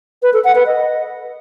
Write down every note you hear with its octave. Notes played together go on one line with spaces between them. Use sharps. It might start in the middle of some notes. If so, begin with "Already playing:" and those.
B4
A4
F#5
B4
D#5